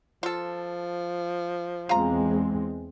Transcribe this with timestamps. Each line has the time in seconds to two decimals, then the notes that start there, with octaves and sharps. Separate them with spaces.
0.23 F3 F4 A4
1.89 E2 G#3 C4 F4 A#5